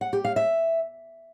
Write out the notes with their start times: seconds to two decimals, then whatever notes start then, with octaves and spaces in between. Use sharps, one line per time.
0.01 F#5
0.13 G4
0.25 F5
0.36 E5